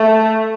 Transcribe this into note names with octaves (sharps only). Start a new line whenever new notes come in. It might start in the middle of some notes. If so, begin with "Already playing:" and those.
Already playing: A3